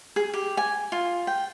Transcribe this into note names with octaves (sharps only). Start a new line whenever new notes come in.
G#4
G4
G#5
F4
G5